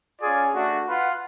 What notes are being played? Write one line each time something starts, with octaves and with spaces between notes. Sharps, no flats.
C#4 F4 G#4 D5
A3 D4 F#4
F4 B4 F#5